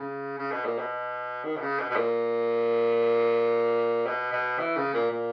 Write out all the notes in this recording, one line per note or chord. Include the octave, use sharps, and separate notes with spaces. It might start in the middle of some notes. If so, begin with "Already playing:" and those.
Already playing: C#3
C#3
B2
A#2
B2
D#3
B2
C#3
B2
B2
A#2
B2
B2
E3
C#3
A#2
A#2